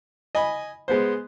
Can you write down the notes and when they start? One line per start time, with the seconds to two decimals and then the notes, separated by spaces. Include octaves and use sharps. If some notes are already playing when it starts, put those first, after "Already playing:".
0.35 D#5 G#5 B5
0.88 G#3 B3 C5